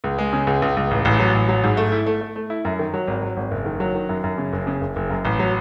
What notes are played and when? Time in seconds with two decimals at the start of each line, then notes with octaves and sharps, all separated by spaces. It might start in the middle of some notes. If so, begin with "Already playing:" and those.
0.04 C#2
0.18 G#3
0.33 C#3
0.47 C#2
0.62 C#2
0.77 C#2
0.91 A1
1.05 A1
1.19 F#3
1.34 A1
1.49 F#3
1.64 G#2
1.77 A3
1.92 E4
2.06 A3
2.21 A3
2.36 A3
2.50 E4
2.65 F#2
2.79 D#3
2.94 F#3
3.07 G#1
3.22 F#3
3.37 G#1
3.51 F#1
3.66 D#3
3.80 F#3
3.95 D#3
4.09 F#2
4.24 F#2
4.38 C#3
4.53 F#1
4.67 C#3
4.81 F#1
4.96 F#1
5.10 F#2
5.25 A1
5.39 F#3